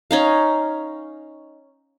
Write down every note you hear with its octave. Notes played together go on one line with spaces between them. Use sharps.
C#4 D#4 F5